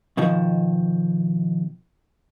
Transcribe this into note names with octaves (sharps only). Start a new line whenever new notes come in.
B2 D#3 F3